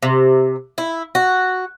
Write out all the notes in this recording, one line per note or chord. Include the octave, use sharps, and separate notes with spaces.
C3
E4
F#4